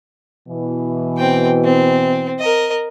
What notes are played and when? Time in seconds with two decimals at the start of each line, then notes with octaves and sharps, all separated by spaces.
0.48 B2 E3
1.18 C4 G5
1.64 C4
2.39 A#4 D#5